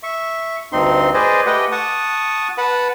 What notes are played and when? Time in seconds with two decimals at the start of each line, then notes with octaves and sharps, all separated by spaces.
0.03 E5 C#6
0.72 D2 G2 C4 D#4 C6
1.14 G#4 B4 C5 D5 D#5
1.46 A3 G4 B4 D#5 F#5 G5
1.72 F#5 A5 C#6 D#6
2.58 B4 F#5 A5 B5